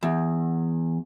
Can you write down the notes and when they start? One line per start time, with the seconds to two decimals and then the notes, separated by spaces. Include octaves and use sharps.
0.03 E2